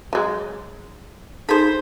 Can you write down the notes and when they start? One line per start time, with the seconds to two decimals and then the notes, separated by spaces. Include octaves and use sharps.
0.13 F#3 G#3
1.49 D#4 G#4 A4 C5 B5